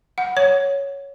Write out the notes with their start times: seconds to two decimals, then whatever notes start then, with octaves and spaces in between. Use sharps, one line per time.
0.18 F#5
0.37 C#5